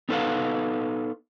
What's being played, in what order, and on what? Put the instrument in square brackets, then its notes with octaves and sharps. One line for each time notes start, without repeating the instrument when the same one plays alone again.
[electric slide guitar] B3 D#4 A4 B4 F5 F#5